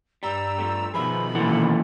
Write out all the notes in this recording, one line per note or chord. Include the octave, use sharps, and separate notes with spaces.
G2 G3 A#5 E6
F3 G3 A3
B2 D#3 F3 G#4 B4 E5 B5
F#2 A#2 E3 A4 F#5